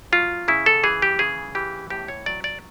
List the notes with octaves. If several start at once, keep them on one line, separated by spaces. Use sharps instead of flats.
F#3 F4
C#3 E4
A4
E3 G#4
G4
C#3 G#4
E3 G4
A2 G4
C#5
F#3 D5
D5